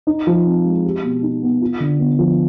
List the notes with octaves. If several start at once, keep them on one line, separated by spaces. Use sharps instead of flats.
D#4
F3
C4
G#3
G4
B2
D#4
B3
F4
D3
B3
F3